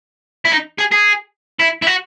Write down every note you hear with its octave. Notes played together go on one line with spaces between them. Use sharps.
E4
D#4
G#4
G#4
E4
E4
F#4